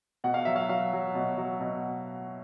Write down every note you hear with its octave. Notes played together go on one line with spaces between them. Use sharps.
B2 F#5
F5
F#3 E5
F5
F#3 F5
F#3
B2
F#3
B2